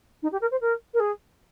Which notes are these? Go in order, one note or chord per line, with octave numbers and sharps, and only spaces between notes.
D#4
G4
A#4
C5
A#4
A#4
G#4